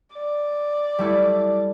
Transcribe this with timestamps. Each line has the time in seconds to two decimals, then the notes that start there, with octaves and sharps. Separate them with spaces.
0.13 D5
0.99 G3 A3 E4